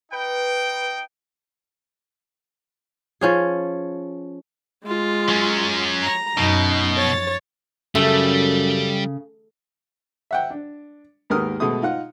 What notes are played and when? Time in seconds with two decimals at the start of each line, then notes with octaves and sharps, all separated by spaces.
0.12 D#4 B4 G5
3.21 F3 C#4 G#4
4.84 G#3 F4
5.28 F#3 C#4
6.04 A#5
6.38 F#2 B2 D#4
6.98 F3 C#5 A6
7.95 F#2 C#3 G3 A3
10.31 E5 F#5 G5
10.50 D4
11.30 D#2 G#2 B3 A#4 D#6 F6
11.60 B2 G#3 A3 D#6
11.82 D#4 F4 F#5